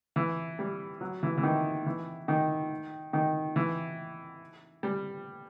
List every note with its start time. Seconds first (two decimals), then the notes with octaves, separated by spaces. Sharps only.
0.16 E3
0.59 G3
1.01 F#3
1.23 E3
1.38 E3
1.43 D#3
1.86 E3
2.28 D#3
3.13 D#3
3.56 E3
4.83 G3